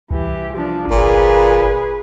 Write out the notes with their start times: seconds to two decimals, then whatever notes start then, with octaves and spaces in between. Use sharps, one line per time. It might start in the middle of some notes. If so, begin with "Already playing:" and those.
0.11 C2 E3 G4
0.53 F3 D4
0.91 G1 A#2 G#4 B4